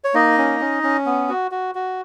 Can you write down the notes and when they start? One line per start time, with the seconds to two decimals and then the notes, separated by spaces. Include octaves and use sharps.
0.04 C#5
0.14 A#3 D#4 D#5
0.38 C#4
0.60 C#4
0.83 C#4
1.06 B3
1.29 F#4
1.51 F#4
1.75 F#4